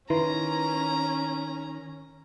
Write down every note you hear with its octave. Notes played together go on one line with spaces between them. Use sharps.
D#3 C#4 E4 B4 A#5 C6